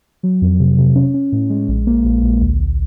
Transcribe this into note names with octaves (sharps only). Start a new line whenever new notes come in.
F#3
F2
C3
C3
C#4
C#4
A2
G#3
A#1
A#3
A#1
A#1
D2
D2